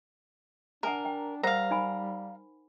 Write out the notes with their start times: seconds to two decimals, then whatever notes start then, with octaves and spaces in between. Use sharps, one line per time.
0.83 D4 A#4 F#5 G#5 A#5
1.05 G5
1.43 G3 A#4 C5 F5 F#5 A#5
1.71 D#4 G#5 B5